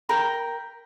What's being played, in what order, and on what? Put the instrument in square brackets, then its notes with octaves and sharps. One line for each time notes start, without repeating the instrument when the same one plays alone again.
[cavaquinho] A#4 G5 B5